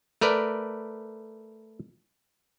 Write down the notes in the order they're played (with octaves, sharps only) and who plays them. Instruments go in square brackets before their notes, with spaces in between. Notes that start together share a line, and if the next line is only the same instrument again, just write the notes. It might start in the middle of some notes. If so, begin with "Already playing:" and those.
[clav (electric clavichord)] A3 A#4 B4 D5